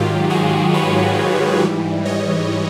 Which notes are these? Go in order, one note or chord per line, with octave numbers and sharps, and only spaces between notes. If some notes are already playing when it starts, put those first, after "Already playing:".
Already playing: G#2 D#3 F#3 F4 G4
F#4 G#4
B4 C#5
G#2 E3 G3
C#5 D#5